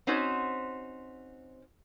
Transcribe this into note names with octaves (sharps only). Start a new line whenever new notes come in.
C4 C#4 D#4 F#4 C5